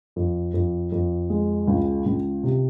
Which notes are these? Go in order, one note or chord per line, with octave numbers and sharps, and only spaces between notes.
F2
F2
F2
G#3
C#2
C#2
C3